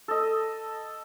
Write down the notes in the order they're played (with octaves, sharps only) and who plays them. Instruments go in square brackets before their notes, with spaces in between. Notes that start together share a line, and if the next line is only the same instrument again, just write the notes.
[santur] A4 D#5